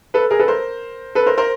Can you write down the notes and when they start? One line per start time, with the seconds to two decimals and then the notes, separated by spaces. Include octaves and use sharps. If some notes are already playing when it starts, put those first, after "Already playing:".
0.14 A4 B4
0.31 G#4 A#4
0.39 A4 B4
0.48 A#4 C5
1.15 A4 B4
1.26 A#4 C5
1.38 A#4 C5